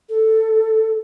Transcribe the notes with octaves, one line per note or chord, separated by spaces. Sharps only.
A4